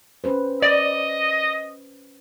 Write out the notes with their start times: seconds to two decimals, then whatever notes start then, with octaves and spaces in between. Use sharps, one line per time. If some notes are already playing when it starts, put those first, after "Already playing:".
0.24 C#4 B4 C5
0.62 D5 D#5